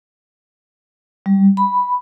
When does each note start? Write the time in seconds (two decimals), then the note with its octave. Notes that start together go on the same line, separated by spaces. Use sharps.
1.26 G3
1.57 B5